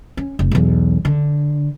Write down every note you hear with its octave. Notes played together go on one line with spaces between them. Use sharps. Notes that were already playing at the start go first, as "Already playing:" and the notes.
C#4
F1
B1 E2
D3